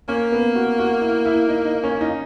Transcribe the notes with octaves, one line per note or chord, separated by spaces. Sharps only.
A#3 C#4
B3
F#4
F#4
E4
E4
D#4
D#4
C#4
D#4